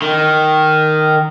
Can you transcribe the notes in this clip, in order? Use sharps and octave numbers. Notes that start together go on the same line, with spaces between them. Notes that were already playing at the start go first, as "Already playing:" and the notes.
D#3